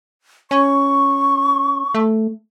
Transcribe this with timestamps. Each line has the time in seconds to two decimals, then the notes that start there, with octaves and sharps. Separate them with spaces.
0.51 C#4 C#6
1.94 A3